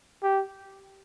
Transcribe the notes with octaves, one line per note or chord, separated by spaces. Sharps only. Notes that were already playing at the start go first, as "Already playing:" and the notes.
G4